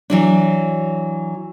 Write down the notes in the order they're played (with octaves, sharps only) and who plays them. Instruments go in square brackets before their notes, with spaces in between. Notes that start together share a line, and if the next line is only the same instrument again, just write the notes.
[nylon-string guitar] E3 F#3 D4